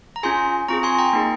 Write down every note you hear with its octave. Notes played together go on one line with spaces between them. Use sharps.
A#5
C#4 F4 G#4 G#5 C6
C4 F4 G#4 A#5 C#6
G#5 C6
G5 A#5
A#3 D#4 G#4